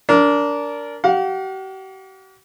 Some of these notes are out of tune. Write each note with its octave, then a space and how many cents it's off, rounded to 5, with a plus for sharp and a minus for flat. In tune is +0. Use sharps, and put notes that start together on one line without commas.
D4 -20 A#4 +0
G4 -45 F5 +45